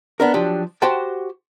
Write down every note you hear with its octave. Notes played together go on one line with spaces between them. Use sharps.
B3 D4 A#4
F3 F#3 D4 G4
F#4 G4 C5 F#5 G5 A5